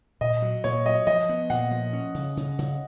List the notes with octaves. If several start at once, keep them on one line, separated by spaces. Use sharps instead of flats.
A#2 D#5
F#3
A#2 C#5
F#3 D#5
F3 D#5
B3
A#2 F#5
F3
C#4
C#3
C#3
C#3